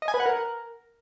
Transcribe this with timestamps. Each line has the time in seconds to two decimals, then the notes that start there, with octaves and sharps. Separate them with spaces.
0.02 D#5
0.08 G#5
0.14 B4
0.20 F#5
0.26 A#4